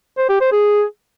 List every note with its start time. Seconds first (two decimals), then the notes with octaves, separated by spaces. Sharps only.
0.18 C5
0.29 G4
0.41 C5
0.52 G#4